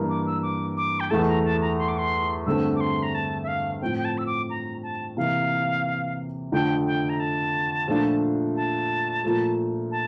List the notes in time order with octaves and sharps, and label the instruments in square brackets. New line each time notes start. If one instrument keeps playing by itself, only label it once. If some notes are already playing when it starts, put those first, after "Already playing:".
Already playing: [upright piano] G2 E3 A#3
[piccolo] D6
E6
D6
D6
G5
[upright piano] E2 E3 A3 [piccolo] A5
[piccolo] A#5
A5
A#5
C6
D6
C6
[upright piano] G2 D3 A3 C4 [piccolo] E6
[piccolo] D6
C6
A#5
A5
E5
F5
[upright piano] A2 F3 C4 [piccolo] G5
[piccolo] G5
A5
E6
D6
A#5
A5
[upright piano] C3 E3 A#3 E4 [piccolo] F5
[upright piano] F2 D3 A3 [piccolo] G5
[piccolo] G5
A#5
A5
[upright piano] A#2 F3 A3 D4 F4
[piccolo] A5
[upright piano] A#2 F3 A3
[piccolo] A5